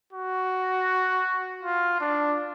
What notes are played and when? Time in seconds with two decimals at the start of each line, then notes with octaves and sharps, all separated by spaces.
0.13 F#4
1.63 F4
2.01 D4